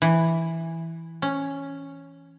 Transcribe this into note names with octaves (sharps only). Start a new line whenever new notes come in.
E3
C#4